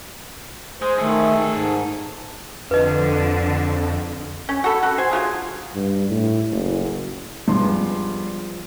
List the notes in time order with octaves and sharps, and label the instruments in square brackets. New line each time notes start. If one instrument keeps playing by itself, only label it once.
[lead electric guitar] G#3 [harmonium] C5
[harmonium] D#3 A3 [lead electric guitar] G#4 A4
[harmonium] G#2
[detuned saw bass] F2 [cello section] D3 [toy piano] B4 D#5
[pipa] C#4
F#4 A4 B5
F#4 A4
C5 G#5
F#3 D#4 F4 G#4
[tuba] G2
A2
F#1
[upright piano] G2 C6 [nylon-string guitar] F3 G#3 B3